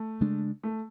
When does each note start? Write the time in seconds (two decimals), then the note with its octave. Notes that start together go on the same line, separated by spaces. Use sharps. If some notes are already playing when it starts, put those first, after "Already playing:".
Already playing: A3
0.20 C#3 G#3 D4
0.63 A3